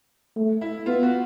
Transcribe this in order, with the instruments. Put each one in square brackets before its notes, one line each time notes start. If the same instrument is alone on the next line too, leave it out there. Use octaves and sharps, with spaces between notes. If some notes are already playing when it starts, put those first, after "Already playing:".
[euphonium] A3
[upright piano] E4
[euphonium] B3 [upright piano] F4
[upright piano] F#4